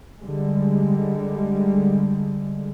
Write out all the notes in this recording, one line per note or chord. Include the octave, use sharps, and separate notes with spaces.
D3 G3 G#3